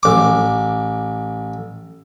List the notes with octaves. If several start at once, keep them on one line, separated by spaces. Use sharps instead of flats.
A1 D6